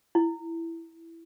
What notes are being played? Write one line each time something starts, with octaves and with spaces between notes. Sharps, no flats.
E4